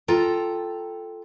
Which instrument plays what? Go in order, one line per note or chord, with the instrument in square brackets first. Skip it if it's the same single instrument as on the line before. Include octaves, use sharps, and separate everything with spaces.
[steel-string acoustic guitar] F4 A4 G5 A#5